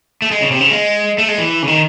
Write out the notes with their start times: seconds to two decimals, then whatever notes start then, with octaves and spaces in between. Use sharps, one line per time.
0.22 A3
0.31 G#3
0.42 C#3
0.51 C3
0.61 C#3
0.71 G#3
1.18 A3
1.28 G#3
1.38 E3
1.63 C#3
1.67 D#3